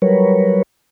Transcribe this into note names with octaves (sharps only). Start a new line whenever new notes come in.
F#3 G3 A#4 B4 C#5